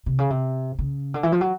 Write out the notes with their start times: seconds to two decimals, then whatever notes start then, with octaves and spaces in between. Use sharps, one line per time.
0.06 C3
0.19 C#3
0.30 C3
0.79 C#3
1.14 D3
1.23 E3
1.32 F3
1.41 F#3